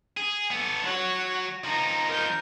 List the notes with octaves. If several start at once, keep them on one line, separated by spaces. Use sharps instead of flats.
G#4
B3 A4
F#3 C#5 F#5
F3 D#4 A#5
A#4 G6